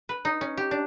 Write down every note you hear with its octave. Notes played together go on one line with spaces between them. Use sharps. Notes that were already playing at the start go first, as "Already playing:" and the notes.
B4
D#4
C#4
G4
D4